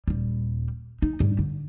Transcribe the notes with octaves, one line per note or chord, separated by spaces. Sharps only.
D#1 G3
D#4
G#2 G3
D3